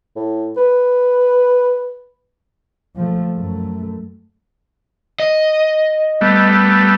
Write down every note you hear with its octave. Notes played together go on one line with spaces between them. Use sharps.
A2
B4
F3 A3
F#2 A3
D#5
G3 A3 B3